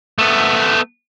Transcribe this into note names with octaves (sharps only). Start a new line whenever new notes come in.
A3 B3